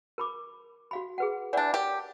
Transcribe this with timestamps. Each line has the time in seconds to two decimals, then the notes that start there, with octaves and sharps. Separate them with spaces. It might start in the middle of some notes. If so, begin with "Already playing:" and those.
0.18 A#4 B5 D6
0.91 F#4 F5 B5
1.18 G#4 B4 F#5
1.53 E3 D4 C#5 D5 F#5
1.74 G4 A#4